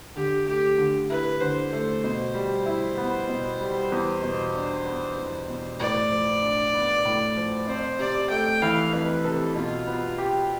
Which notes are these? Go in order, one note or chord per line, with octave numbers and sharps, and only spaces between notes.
D3 G4
A3 G4
D3
E4 B4
D3 C5
A3 C5
B2 C5
G3
E4
B3
B2
G3
E2
B2
D4
B3
E2
B2
A2 D5
F3
D4
B3
A2
F3
F2 C5
C3 D5
A3 G5
E3 F5
F2 B4
C3 A4
B2 F4
B3
G4